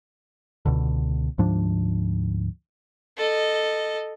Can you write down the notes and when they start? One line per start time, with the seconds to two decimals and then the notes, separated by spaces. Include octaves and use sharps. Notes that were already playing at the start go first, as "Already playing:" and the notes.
0.66 C#2 B2 D3
1.38 D2 G#2 F3 D4
3.17 A4 D#5